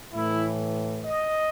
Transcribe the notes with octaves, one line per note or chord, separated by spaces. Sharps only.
A2 E3 E4
D#5